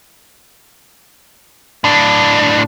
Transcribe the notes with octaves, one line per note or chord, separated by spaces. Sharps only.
A2 D4